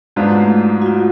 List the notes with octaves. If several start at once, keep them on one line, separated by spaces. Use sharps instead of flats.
G#2 F#3 G#3 B3 D4 F4
A3
F#4
F4